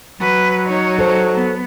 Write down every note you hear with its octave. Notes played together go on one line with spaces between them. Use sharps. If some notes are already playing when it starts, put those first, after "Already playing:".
F#3 B4
D#4 C#5
A4 C5
B3